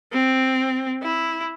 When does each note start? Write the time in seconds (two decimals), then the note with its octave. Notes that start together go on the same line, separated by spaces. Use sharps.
0.12 C4
1.02 E4